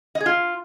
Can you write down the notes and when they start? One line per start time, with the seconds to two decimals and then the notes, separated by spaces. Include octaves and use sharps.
0.15 D#5
0.20 G#4
0.26 F4